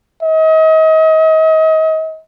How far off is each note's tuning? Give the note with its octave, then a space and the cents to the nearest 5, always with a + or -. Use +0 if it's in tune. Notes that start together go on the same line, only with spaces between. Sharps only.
D#5 +35